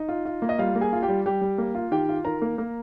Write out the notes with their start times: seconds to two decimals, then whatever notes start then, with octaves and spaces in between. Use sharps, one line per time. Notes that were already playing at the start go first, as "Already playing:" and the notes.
Already playing: D#4 D#5
0.08 F4
0.25 F4
0.42 A#3
0.49 D#5
0.58 G3 F4 F5
0.75 A#3
0.81 G#4 G#5
0.93 F4
1.03 G4 G5
1.09 G3
1.26 G3 G4 G5
1.41 G3
1.58 A#3
1.75 F4
1.91 D#3 G4 G5
2.09 F4
2.25 D#3 A#4 A#5
2.42 A#3
2.58 A#3